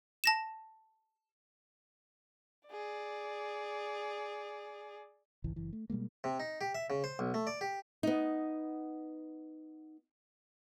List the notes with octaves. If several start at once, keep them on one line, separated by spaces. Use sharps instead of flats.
A5 A#6 E7
G#4 D5
G#1 C#2 E3
F#1 E3
A3
B2 G3 G#3 A#3
C3
D#4
G4
E5
C#3
C5
B1
A3
D5
G4
B3 D#4